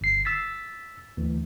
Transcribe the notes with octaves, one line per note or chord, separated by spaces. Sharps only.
G1 C7
E6 A6 B6
D2 E3